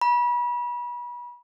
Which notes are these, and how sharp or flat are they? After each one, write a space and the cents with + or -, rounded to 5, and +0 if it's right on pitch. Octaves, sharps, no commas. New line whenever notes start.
B5 -30